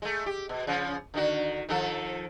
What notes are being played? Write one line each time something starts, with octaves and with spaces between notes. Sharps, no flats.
G#3 A3
G4
B2
C#3 F3
D3 D#3 F#4
D#3 F3 A4